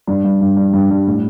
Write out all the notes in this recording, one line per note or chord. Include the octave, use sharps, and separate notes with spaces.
G2 D4
G3
G2
G3
G2
G3
A2